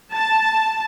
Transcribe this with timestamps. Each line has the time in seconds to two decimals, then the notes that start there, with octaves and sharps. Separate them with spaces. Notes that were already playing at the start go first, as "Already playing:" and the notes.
0.14 A5